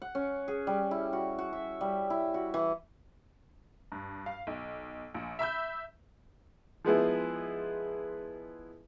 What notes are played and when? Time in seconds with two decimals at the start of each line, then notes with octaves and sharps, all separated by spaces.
0.02 F#5
0.15 C#4
0.48 G#4
0.67 G3
0.91 E4
1.13 F#4
1.39 F#4
1.53 E5
1.81 G3
2.10 E4
2.34 F#4
2.54 E3
3.92 G2
4.26 F5
4.47 B1
5.14 A#1
5.39 E5 B5 E6 G6
6.84 F3 G#3 B3 E4